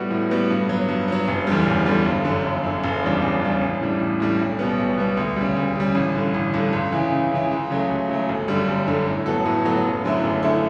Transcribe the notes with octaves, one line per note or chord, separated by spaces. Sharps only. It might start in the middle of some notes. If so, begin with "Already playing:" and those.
Already playing: A2 G3 B3 F#4
A2
G3 B3 F#4
G2
F#3 B3
G2
F#3 B3
F#1
E2 D3 G3
F#1
E2 D3 G3
G1
F#2 D3
G1
F#2 D3
F#1
E2 C#3 G3 D4
F#1
E2 C#3 G3 D4
A1
A2 G3 D4
A1
A2 G3 D4
B1
B2 G3 B3
B1
B2 G3 B3
D2
C#3 G3
D2
C#3 G3
A1
G2 D3
A1
G2 D3
C#2
C#3 E3
C#2
C#3 E3
C#2
C#3 F#3 A3
C#2
C#3 F#3 A3
G1
F#2 D3 G3
G1
F#2 D3 G3
A2
F#3 B3 F#4 A4
A2
F#3 B3 F#4 A4
F#1
F#2 D3 A3 E4
F#1
D3 A3 E4